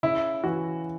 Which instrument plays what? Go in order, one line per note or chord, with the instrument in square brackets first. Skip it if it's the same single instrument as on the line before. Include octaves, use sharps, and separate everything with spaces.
[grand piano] C#3 [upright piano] E4
[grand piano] E3 [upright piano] F#4